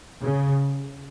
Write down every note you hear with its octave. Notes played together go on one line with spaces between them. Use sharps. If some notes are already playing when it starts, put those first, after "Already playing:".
C#3